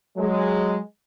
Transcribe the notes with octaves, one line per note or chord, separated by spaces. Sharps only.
F#3 G#3